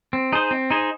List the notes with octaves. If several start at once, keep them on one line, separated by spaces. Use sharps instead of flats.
C4
D#4 G#4 C5
C4
D#4 G#4 C5